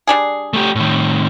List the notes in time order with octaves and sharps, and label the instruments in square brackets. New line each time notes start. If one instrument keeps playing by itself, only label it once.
[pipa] G3 D4 G#4
[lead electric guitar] A3 G4
A2 D#3